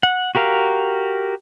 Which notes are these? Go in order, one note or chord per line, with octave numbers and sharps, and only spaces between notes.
F#5
F#4 G4 A#4 F5